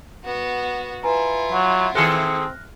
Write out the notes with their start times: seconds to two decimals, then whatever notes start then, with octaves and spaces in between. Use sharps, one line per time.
0.24 B3 F#4
1.03 E4 F4 B4 G#5 A#5
1.52 F#3 F#5
1.95 D#3 C4 G#4 A4 F6 F#6 A#6